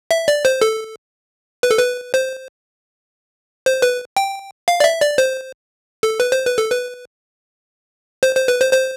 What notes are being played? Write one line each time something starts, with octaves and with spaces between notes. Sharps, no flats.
E5
D5
C5
A4
B4
A4
B4
C5
C5
B4
G5
F5
D5
E5
D5
C5
A4
B4
C5
B4
A4
B4
C5
C5
B4
C5
C5